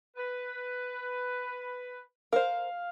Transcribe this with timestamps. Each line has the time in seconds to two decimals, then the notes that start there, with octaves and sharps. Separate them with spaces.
0.16 B4
2.32 A#4 C5 F5